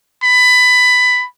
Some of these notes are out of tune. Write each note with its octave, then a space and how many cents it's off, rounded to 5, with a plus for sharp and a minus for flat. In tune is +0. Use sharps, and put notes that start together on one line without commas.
B5 +15